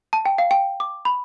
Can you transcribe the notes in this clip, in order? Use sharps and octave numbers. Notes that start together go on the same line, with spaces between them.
A5
G5
F5
G5
D6
B5